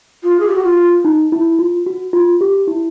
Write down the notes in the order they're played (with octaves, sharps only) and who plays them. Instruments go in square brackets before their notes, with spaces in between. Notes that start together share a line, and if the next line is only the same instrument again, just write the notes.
[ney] F4
G#4
G4
F#4
F4
[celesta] D#4
E4
F4
F#4
F4
G4
E4